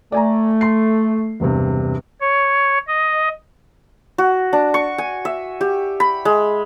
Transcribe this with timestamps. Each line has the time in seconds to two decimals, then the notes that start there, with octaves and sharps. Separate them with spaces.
0.12 A3 D5 G#5 A#5
0.61 C6 C7
1.40 E1 G2 C3
2.21 C#5
2.87 D#5
4.18 F#4
4.53 D4
4.74 C#6
4.98 G#5
5.25 E5
5.61 G4
6.00 B5
6.25 G#3